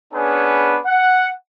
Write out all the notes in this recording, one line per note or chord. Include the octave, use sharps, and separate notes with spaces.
B3 C#4 D4 G#4 B4
F#5